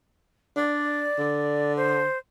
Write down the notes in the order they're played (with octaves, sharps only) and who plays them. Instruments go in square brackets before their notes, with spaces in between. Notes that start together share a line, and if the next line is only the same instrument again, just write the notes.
[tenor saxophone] D4 [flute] D5
[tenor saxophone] D3
[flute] C5